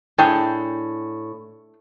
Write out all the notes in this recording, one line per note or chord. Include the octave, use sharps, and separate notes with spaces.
A2 D4 G#4 G5